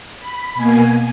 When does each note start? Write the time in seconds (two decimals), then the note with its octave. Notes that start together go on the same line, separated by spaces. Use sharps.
0.19 B5
0.55 B2 A#3 G#5